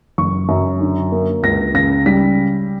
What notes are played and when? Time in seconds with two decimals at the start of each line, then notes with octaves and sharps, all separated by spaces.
0.18 F#1 C#6
0.49 F#2
0.81 D3
1.12 A#3
1.43 C#2 A#6
1.74 C#3 A#6
2.06 G3 B6